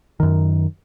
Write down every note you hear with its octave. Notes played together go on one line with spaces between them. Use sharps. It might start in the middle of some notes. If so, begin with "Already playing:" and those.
F#2 D#3